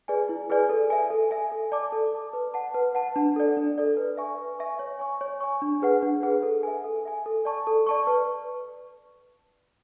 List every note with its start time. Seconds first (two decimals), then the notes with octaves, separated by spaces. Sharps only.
0.08 G#4 B4 D5 G#5
0.29 E4
0.50 G#4 B4 D5 G#5
0.69 A4
0.90 E5 G#5
1.10 A4
1.31 E5 G#5
1.52 A4
1.72 D5 A5 D6
1.92 A4
2.12 D5 A5 D6
2.33 B4
2.54 F#5 A5
2.74 B4
2.95 F#5 A5
3.16 D4
3.36 A4 D5
3.57 D4
3.78 A4 D5
3.97 B4
4.17 E5 G#5 C#6
4.39 B4
4.59 E5 G#5 C#6
4.79 C#5
4.99 G#5 C#6
5.21 C#5
5.40 G#5 C#6
5.62 D4
5.82 G#4 B4 F#5
6.02 D4
6.23 G#4 B4 F#5
6.43 A4
6.63 E5 G#5
6.84 A4
7.05 E5 G#5
7.26 A4
7.45 D5 A5 C#6
7.67 A4
7.87 D5 A5 C#6
8.07 B4